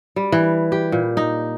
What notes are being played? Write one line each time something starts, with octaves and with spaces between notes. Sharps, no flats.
G3
E3
G4
A#2
D#4